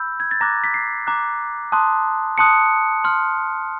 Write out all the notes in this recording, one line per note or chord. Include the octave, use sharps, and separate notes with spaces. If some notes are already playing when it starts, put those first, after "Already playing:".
Already playing: B5 E6 G6
G#6
A6
A#5 D6 F#6 A#6
B6
C7
A#5 D6 F#6
A5 C6 D#6 F#6
A5 C6 D#6 F#6 C#7
C6 F6